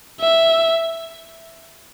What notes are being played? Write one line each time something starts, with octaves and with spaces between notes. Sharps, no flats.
E5